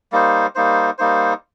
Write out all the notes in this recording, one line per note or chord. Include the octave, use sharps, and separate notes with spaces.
G3 A#3 D#4 C5
G3 A#3 D#4 C5
G3 A#3 D#4 C5